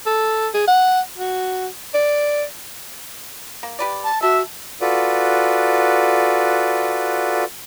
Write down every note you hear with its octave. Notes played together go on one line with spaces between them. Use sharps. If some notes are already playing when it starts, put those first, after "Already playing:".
A4
G#4
F#5
F#4
D5
A#3
G4 B4 D5
A5
F#4 A4 E5
F4 F#4 A4 B4 D5